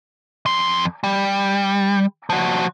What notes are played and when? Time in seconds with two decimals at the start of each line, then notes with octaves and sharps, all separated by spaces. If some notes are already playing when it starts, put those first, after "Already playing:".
0.46 F2 C6
1.04 G3
2.30 F3 F#4